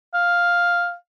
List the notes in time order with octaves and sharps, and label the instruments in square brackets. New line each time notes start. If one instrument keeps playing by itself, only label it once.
[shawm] F5